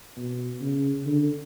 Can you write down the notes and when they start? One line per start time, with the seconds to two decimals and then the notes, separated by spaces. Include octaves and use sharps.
0.16 B2
0.61 C#3
1.06 D3